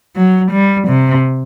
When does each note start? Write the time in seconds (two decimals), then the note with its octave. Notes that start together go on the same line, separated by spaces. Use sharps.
0.16 F#3
0.52 G3
0.88 C3